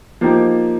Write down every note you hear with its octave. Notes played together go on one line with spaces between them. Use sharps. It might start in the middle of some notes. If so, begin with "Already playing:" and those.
F3 A#3 D#4 G4